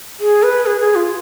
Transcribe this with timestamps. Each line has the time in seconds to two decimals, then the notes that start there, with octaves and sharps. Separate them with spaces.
0.20 G#4
0.43 B4
0.66 G#4
0.81 G#4
0.96 F4